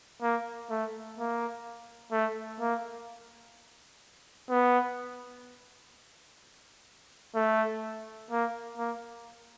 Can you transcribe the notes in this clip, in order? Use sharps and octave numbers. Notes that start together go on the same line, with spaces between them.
A#3
A3
A#3
A3
A#3
B3
A3
A#3
A#3